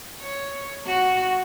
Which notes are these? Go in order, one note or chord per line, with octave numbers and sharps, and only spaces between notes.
C#5
F#4